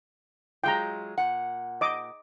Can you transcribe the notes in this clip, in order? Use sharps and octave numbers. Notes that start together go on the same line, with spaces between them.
F#3 G#3 F4 G5 A#5
A#2 F#5
D#5 D6